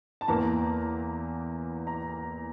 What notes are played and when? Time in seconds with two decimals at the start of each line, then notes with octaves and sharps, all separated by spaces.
0.21 A5
0.28 E2 E3 A#3 A#5
1.87 A#5